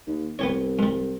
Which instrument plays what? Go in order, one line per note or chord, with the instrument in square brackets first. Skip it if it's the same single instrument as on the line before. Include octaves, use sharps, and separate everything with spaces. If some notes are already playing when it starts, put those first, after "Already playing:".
[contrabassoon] D#2
[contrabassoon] C2 [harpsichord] B3 G4 C#5
[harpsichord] G2 G3